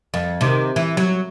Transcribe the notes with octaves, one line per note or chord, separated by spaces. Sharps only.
F2
C3 D#3
E3
F#3